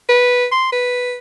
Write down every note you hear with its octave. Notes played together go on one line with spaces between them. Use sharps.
B4
C6
B4